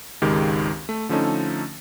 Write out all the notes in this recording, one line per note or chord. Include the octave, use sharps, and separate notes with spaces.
G#1 C#2 D#3 G#3 G4
A3
D3 F3 A3 C#4 D#4 A4